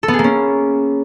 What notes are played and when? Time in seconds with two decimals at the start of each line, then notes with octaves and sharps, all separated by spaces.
0.03 A4
0.08 B3
0.14 G#4
0.19 A#3
0.24 C#4